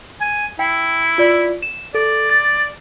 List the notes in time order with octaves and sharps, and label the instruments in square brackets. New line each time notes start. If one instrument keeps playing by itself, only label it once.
[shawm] G#5
[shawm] E4 [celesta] G5
[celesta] F4 D5
E7
[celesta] A4 [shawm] D5
[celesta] A6